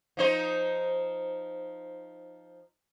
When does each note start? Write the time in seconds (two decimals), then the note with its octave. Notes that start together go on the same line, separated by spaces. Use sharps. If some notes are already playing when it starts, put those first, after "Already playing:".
0.17 F3 D#4 C5